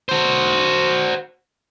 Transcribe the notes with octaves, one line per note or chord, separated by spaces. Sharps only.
F#4 C5